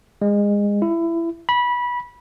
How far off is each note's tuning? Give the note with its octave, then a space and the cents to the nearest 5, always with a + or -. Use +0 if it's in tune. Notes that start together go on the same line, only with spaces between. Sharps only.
G#3 -25
E4 +20
B5 -20